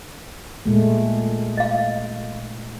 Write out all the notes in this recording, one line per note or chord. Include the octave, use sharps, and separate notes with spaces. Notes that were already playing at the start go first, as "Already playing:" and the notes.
A#2 G#3 A3
D#5 F5